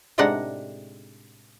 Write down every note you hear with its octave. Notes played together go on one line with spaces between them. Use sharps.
A2 C3 G#3 D4 D#4 F#5